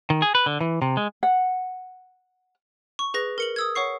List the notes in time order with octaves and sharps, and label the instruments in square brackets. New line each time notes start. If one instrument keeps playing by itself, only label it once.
[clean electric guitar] D#3
G#4
B4
D3
E3
C3
G#3
[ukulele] F#5
[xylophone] C#6
G#4 B4 A#6
A#4 C#7 F#7
D#6 E6 G#6
C#5 F#5 C#6 C7